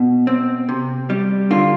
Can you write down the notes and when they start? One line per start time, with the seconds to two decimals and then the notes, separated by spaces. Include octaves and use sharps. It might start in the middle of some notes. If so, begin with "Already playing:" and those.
Already playing: B2
0.27 C4
0.69 C3
1.10 G3
1.51 D3 F4